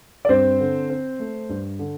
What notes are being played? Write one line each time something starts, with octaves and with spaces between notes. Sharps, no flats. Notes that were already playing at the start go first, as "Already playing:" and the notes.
D5
G2 C4 C5
D3
C4
A3
G2
D3